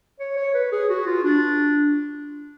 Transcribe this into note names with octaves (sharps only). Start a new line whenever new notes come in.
C#5
C#5
B4
G#4
F#4
F4
D4